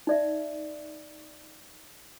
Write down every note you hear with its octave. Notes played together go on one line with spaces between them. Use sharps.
D#4 D5 E5